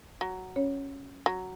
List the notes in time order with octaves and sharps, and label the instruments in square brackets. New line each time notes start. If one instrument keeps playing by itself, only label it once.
[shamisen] F#3
[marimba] C#4 C#5
[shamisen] F#3